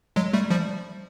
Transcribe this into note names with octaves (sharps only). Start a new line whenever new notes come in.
F#3 G#3
G3 A3
F3 G3